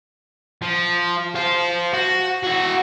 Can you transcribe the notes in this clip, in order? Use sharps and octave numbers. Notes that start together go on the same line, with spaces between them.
F3
C5 F5
F#4
E4 F#4